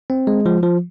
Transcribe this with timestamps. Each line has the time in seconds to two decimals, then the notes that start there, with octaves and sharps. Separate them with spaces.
0.10 C4
0.27 G#3
0.46 F3
0.63 F3